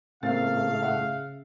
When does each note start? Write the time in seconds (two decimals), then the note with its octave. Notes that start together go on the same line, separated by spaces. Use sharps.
0.23 A2 C#3 A3 A#3 C4 F5 A6
0.82 E5 F#5